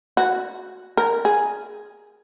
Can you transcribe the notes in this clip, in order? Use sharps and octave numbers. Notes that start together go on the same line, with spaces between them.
F#4
A#4
G#4